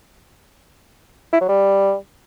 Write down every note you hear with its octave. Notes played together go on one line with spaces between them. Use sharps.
E4
F#3
G3